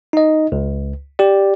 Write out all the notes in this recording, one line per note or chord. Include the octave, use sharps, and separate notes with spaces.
D#4 D#5
C#2
G4 D5